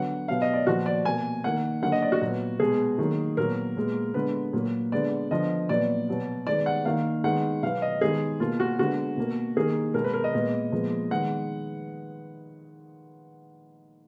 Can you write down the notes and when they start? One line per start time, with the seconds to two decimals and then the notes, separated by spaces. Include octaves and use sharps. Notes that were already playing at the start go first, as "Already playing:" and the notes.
Already playing: D3 F#3 B3 F#5
0.28 B2 F#3 B3 F5
0.42 D#5
0.53 D5
0.67 A#2 F3 B3 F#4
0.86 D5
1.05 B2 A#3 G#5
1.44 D#3 A#3 F#5
1.82 D3 F#3 A#3 F#5
1.92 D#5
2.02 D5
2.12 F#4
2.22 A#2 F#3 B3
2.60 B2 G#3 B3 G#4
2.98 D#3 F#3 A#3
3.37 A#2 F#3 B3 A#4
3.77 A#2 G#3 B3
4.14 D3 G#3 B3 B4
4.53 A#2 F#3 A#3
4.92 D3 G#3 B3 D5
5.31 D3 F3 B3 D#5
5.69 A#2 F#3 B3 D5
6.08 B2 F#3 B3
6.47 D#3 G#3 B3 D5
6.66 F#5
6.85 D#3 A#3 F5
7.24 D#3 G#3 B3 F#5
7.63 B2 F#3 B3 F5
7.82 D#5
8.01 D#3 G#3 B3 G#4
8.40 B2 A#3 F4
8.60 F#4
8.79 D3 G#3 B3 F#4
9.17 B2 A#3
9.57 D#3 A#3 G#4
9.94 B2 G#3 B3 A#4
10.04 B4
10.14 A#4
10.24 D#5
10.33 A#2 G#3 B3
10.72 A#2 F3 G#3 B3
11.11 D#3 G#3 B3 F#5